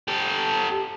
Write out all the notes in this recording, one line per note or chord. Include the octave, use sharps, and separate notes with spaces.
G4 A4